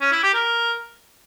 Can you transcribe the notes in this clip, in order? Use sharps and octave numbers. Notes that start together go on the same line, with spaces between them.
C#4
E4
G4
A#4